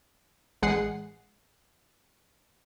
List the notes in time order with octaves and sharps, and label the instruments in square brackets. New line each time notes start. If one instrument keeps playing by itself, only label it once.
[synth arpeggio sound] A1 G#3 G#4 F#5 C7